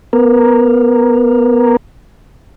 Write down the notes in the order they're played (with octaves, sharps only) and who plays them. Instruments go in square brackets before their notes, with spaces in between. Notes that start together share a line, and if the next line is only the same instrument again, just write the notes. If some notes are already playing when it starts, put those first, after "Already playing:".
[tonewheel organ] B3 A#4